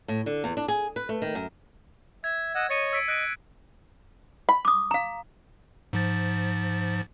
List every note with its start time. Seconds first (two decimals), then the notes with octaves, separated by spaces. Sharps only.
0.08 A2
0.26 D3
0.44 E2
0.57 D4
0.68 G#4
0.96 B4
1.09 A3
1.22 D#3
1.35 F#2
2.24 E5 G#6
2.55 D#5 F#5 E6
2.70 C#5 D#5 A6 C#7 D#7
2.93 E6 B6 D7
3.08 D#5 F#6 D7 D#7
4.49 B5
4.65 D6 D#6
4.91 F5 A#5
5.93 G#2 F3 A6